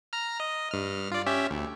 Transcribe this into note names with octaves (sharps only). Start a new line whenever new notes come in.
A#5 F6
D#5
G2 F6
F4 D5
C#4 G4 E5
D2